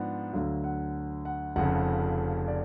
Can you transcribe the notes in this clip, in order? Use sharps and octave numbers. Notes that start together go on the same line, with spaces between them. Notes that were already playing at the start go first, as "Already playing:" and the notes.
Already playing: G#2 F3 B3 D4 F#5
D2 D3 F#3 F5
F#5
F#5
F1 F2 C#3 F#5
D5